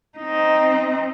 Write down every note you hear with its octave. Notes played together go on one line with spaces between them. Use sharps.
C4 D#4